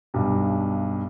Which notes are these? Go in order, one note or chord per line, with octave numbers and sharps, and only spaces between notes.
B1 G2